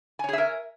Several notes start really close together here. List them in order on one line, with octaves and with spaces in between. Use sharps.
G#5 C#5 G#4 E5 A#4